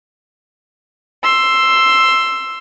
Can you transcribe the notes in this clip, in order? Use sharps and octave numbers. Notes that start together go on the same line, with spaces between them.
C6 E6